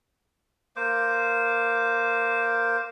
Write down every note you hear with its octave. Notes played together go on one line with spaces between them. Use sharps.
A#3 C5 D6